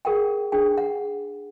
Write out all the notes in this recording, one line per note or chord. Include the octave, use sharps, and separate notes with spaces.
G#4 A#4 F#5 G5
D4 G#4 G5
F#5